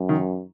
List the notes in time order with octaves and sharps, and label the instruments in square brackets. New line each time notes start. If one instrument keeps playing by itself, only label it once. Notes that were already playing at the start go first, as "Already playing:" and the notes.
Already playing: [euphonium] F#2
[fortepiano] D#3